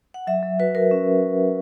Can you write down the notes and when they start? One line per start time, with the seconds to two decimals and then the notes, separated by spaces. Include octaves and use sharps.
0.14 F#5
0.27 F#3 E5
0.43 F#3
0.59 F#4 B4
0.75 F#4 A#4
0.91 C#4